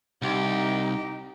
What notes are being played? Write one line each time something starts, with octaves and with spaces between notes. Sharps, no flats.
C2 D#4 G4